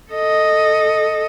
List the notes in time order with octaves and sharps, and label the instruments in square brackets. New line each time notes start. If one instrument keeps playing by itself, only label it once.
[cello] A4 D#5